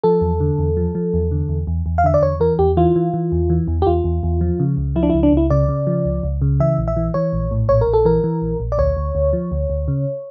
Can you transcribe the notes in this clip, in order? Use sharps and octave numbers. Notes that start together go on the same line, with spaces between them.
F3 A4
E2
D3
E2
F3
F3
E2
D3
E2
E2
E2
F5
D3 E5
D5
E2 C#5
E3 A#4
E2 G4
E3 F4
E3
E3
E2
E3
E2
G4
E2 F4
E2
E2
F3
C#3
C#2
F3 E4
D4
C#2 E4
D4
C#2 E4
C#3 D5
C#3
F3
C#2
C#2
C#3
E3 E5
A#1
E5
E3
E3 C#5
A#1
A2
A#1 C#5
A#4
A#1
A4
E3 A#4
E3
A#1
A#1
D5
D2 C#5
D2
D2
F3
D2
D2
C#3